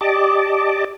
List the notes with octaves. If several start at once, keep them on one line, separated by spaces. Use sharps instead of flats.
G4 D5 D#5 A5 D6